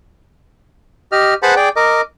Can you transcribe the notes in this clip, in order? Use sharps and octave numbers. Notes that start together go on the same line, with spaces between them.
G4 D#5 F6
G#4 B4 C5 F#5 A5 B5
G#4 D5 G5
A#4 D#5 D6